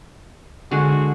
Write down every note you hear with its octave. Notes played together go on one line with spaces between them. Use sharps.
D3 G#3 F#4